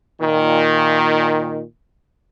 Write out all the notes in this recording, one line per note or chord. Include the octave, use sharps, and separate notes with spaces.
A#2 D#3